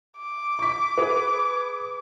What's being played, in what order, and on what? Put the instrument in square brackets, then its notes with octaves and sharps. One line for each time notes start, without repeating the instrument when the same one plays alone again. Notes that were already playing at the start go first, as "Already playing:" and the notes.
[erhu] D6
[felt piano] C#6 B6
G#4 B4